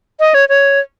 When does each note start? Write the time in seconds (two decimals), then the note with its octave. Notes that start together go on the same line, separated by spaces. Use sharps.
0.20 D#5
0.34 C#5
0.49 C#5